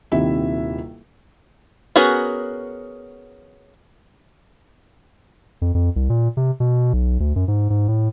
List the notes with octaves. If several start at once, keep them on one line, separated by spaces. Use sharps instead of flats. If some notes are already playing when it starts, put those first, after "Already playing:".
D#1 C3 D#3 E4 E5
B3 C#4 F#4 G#4 A#4
F2
F2
C2
A#2
C3
B2
B1
D2
F#2
G#2
G#2
A2